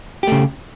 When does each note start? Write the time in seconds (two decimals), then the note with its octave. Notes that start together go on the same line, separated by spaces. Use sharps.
0.23 G4
0.27 A3
0.32 C#3